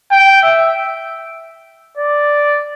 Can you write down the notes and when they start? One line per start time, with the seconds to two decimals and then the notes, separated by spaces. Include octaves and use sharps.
0.12 G5
0.43 E5
1.97 D5